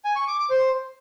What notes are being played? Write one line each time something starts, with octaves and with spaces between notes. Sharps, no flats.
G#5
C#6
D6
D6
C5